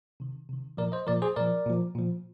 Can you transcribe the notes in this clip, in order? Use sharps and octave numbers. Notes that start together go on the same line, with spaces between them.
C3 D#3
C3 D#3
A#2 F3 A#4 D5
C5 D#5
A#2 F3 A#4 D5
G#4 C5
A#2 F3 A#4 D5
A#2 F3
A#2 F3